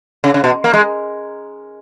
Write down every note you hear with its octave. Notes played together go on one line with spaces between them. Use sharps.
C#3
C#3
B2
A#3
G#3